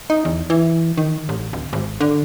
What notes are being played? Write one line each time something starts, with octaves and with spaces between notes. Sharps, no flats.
D#4
E2
E3
D#3
A1
D1
G#1
D3